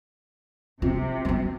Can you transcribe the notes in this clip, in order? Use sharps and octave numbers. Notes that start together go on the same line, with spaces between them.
C3 F4
F#3 C4